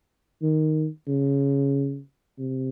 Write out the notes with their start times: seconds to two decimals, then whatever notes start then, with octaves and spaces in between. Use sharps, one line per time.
0.42 D#3
1.08 C#3
2.39 C3